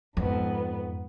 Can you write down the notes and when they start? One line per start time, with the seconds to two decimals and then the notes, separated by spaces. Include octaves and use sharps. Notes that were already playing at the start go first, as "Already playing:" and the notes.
0.17 F2 G#2 B3